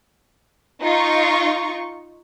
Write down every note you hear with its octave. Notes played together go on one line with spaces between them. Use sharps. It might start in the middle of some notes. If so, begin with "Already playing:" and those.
D#4 F4 C#6